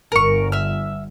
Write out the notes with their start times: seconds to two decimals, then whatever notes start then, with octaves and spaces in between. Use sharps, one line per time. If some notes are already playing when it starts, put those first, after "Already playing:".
0.12 G1 A#4 C#6
0.52 E5 F6